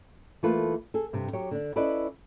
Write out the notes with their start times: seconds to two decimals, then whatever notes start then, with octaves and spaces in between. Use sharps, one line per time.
0.43 E3 A3 A#3 F4 A4 B4
0.94 G#4 A4
1.13 G2 C3
1.33 F#3 G4 C#5
1.51 D3 D4
1.76 C#4 E4 A4 B4 D5 D#5